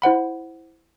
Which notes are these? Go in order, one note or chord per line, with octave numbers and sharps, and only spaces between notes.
E4 C5 F#5 B5